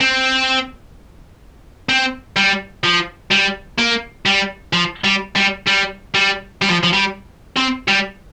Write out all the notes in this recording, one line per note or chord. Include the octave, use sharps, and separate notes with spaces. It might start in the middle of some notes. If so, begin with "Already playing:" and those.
C4
C4
G3
F3
G3
A#3
G3
F3
G3
G3
G3
G3
G3
F3
F3
G3
C4
G3